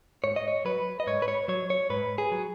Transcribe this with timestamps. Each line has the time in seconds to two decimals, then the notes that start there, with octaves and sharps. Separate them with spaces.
0.24 G#2 C#5
0.36 D#5
0.48 C#5
0.65 F#3 B4
1.00 D#5
1.07 G#2 C#5
1.22 B4
1.28 C#5
1.48 F#3 C#5
1.70 C#5
1.90 G#2 B4
2.18 G#4
2.32 F#3